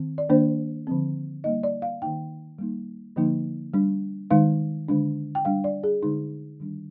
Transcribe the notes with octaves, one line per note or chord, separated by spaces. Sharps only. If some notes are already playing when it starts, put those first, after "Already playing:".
Already playing: D#3 C4
D5
D#3 A#3 D4 C5
D3 F3 C4
G3 A#3 D#4 D#5
D5
F5
D#3 A#3 D#4 G5
G3 A#3 D#4
D3 F3 A#3 D#4
G3 D4
D#3 G#3 D#4 F5
D3 G#3 D4
G5
G3 D4 F5
D5
G#4
D3 G#3 D#4
D#3 G3 D4